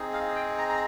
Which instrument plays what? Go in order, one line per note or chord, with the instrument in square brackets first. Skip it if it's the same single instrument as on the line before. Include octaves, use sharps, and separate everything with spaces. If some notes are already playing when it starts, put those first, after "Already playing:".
Already playing: [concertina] C4 D#4 G#4
F5
G5
A#5
A#5